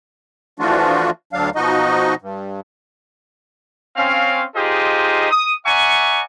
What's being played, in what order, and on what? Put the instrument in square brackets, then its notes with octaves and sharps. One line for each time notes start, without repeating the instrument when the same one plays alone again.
[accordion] E3 F3 A3 D4 F4 F#4
D2 F#3 D4 F5
B2 F3 D#4 F#4 D#5
G2
[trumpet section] C4 C#4 F5
D#4 F4 G4 G#4 C5 D#5
D#6
D5 E5 F#5 G#5 A#5 C#6